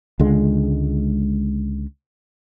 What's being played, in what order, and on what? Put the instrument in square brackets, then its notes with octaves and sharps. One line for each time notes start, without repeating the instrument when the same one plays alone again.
[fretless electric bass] C#2 D3 G#3